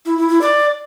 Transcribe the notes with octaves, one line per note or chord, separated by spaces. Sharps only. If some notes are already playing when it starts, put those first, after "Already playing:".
E4
E4
E4
D5